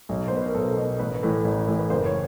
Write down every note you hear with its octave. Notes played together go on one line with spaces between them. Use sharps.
B1
C5
B2 B4
A#4
B1 A4
B2
A1 B4
A2 E3
A1
A2 E3
B4
F#1 C5
C#5